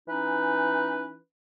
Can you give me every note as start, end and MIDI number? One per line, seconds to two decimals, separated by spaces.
0.09 1.17 52
0.09 1.17 61
0.09 1.17 63
0.09 1.17 71